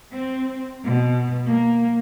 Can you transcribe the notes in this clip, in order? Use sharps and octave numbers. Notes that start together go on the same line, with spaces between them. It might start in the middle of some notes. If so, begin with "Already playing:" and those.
C4
B2
A#3